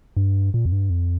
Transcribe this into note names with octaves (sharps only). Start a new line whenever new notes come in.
G2
A#2
F2
G2
F2